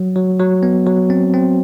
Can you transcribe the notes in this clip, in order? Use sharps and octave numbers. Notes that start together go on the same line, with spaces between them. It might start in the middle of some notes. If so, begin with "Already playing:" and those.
Already playing: F#3
F#3
F#3
B3
F#3
C4
C4